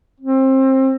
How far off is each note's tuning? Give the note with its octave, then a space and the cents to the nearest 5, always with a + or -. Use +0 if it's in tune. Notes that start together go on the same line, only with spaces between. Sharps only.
C4 +25